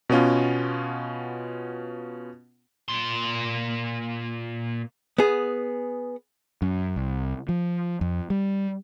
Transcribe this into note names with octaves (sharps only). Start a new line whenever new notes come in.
B2 B3 C#4 F4
A#2 C6
B3 G#4
F#2
C2
F3
F2
G3